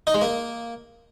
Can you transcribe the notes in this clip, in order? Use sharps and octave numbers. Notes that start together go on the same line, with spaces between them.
D#4
G#3
A#3